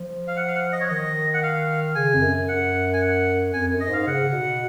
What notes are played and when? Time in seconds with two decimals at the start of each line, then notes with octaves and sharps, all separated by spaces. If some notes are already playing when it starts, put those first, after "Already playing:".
Already playing: F3
0.27 F5
0.37 F#5
0.48 F5
0.55 F#5
0.73 D#5
0.80 C#5
0.89 D#3 D#5
1.34 F#5
1.43 F5
1.95 C#3 G#5
2.14 F2
2.22 F#2
2.48 F#2 F#5
2.93 G#5
3.01 F#5
3.53 F2 G#5
3.71 F#2
3.80 D#5
3.89 G#2 F5
4.07 C#3 F#5
4.28 C#3
4.33 B2